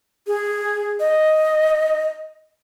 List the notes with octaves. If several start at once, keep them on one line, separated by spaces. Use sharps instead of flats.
G#4
D#5